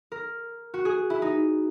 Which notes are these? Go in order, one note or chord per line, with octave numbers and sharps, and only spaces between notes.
A#4
F#4
G#4
E4
D#4